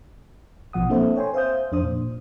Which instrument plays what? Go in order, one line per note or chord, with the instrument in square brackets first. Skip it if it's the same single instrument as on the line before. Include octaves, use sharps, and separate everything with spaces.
[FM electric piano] A#1 B2 F3 F#5 D#6
A#3 C4 D4 A4 C5 E5
C#5 G5 G#5 C6
C5 E5 F5 D#6 G6
F2 D4 C5 D#6
A#2